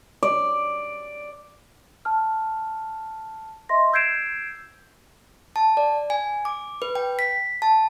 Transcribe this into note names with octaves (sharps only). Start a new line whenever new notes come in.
D5
A5 F6
D#5 E5 C6 A#6
E6 G6 G#6 C7 D7 E7
A5
D5
G#5
D6
B4
G5
B6
A5